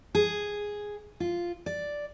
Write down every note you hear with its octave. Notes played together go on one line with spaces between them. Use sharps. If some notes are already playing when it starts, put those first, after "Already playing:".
G#4
F4
D5